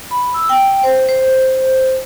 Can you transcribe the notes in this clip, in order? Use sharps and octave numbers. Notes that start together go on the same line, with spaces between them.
B5
E6
G5
C5
C5